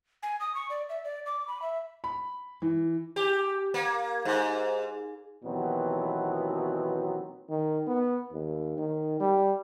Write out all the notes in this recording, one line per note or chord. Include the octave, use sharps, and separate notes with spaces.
G#5
D#6
C#6
D5
E5
D5
D6
B5
E5
B5
E3
G4
A#3
G#2
D#2 B2 E3 F#3 B3 C4
D#3
B3
D#2
D#3
G3